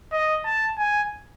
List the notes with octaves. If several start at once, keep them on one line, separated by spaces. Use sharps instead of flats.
D#5
A5
G#5